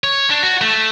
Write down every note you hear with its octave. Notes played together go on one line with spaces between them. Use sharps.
C#5
D4
F#4
A3